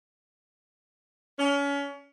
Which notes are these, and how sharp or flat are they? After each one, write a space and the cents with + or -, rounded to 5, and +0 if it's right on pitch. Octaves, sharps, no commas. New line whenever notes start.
C#4 +30